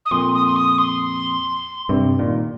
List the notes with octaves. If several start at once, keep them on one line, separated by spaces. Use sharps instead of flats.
D#6
F2 A#2 C6
D#6
C6
D#6
C6
G2 C3
A#2 D#3